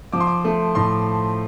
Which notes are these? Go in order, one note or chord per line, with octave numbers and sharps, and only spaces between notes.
F3 D6
C6
D6
A3
A2 C6